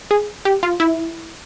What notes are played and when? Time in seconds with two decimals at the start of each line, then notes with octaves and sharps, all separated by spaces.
0.11 G#4
0.45 G4
0.63 F4
0.80 E4